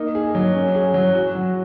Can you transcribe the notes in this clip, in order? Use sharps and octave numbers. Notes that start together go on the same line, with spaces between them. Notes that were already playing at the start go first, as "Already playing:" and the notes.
Already playing: A#3 D#4
G#4
F#3
C#4
G#4
F#3
F#4
F#3